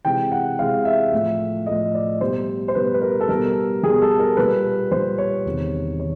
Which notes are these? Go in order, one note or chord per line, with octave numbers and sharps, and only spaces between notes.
C3 E3 G#3 G5
F#5
C3 E3 G#3 F5
E5
A2 F3 A3
A2 F3 A3 D#5
D5
B2 G3 C5
C5
B2 G3 B4
B4
A#4
A4
B2 G3 A#4
B2 G3 G#4
A4
A#4
A#2 G3 B4
A#2 G3 C5
C#5
E2 C3 D#3
D#3 C#5